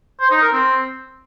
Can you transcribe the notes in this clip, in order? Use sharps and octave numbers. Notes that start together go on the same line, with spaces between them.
C5
D#4
A#4
C4